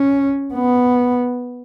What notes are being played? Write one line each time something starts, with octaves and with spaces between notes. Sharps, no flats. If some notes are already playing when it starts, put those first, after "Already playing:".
Already playing: C#4
B3